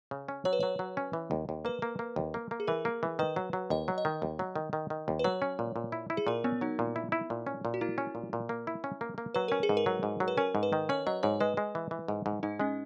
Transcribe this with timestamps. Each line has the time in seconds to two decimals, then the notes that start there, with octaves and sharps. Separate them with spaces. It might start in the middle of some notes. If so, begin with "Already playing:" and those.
0.11 C#3
0.28 C#4
0.45 F#3 C#5
0.53 B4
0.60 F#3 C#5
0.79 F#3
0.97 C#4
1.13 E3
1.31 D#2
1.49 D#2
1.65 A#3 B4
1.82 A#3
1.99 A#3
2.16 D#2
2.34 A#3
2.51 A#3
2.60 G#4
2.67 E3 A#4
2.85 A#3
3.03 E3
3.19 D#3 B4
3.36 F#3
3.53 F#3
3.70 D#2 D#5
3.88 F#3
3.98 D#5
4.05 D#3
4.22 D#2
4.39 F#3
4.56 D#3
4.73 D#3
4.90 D#3
5.08 D#2
5.19 B4
5.24 F#3 C#5
5.42 C#4
5.59 A#2
5.76 A#2
5.92 E4
6.10 E4
6.17 G#4
6.27 A#2 A#4
6.44 B3 C#4
6.61 F#3 D#4
6.79 A#2
6.96 E4
7.12 E4
7.30 A#2
7.47 C#4
7.65 A#2
7.74 F#4
7.81 A#3 E4
7.98 C#4
8.15 A#2
8.33 A#2
8.49 A#3
8.67 E4
8.84 C#4
9.01 A#3
9.18 A#3
9.34 F#3 B4
9.48 C#4 A#4
9.63 G#4
9.69 G#2
9.77 A#4
9.86 F#3
10.03 G#2
10.20 F#3
10.28 B4
10.37 C#4 A#4
10.55 G#2
10.63 B4
10.73 D#3
10.89 C#4 C#5
11.07 F#3 D#5
11.23 G#2 C#5
11.40 G#3 B4
11.57 G#3
11.75 E3
11.91 E3
12.08 G#2
12.26 G#2
12.43 G#2 D#4
12.59 G#3 C#4